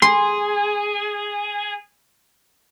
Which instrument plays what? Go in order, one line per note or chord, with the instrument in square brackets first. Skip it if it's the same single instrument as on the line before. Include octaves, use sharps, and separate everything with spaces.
[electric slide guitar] G#4 [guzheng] C6